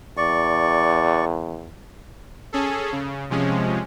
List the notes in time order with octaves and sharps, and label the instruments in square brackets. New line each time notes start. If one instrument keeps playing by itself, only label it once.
[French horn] E2 [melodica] D5 C#6
[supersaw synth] C#4 G#4 A4
C#3
C3 F3 G#3 C#4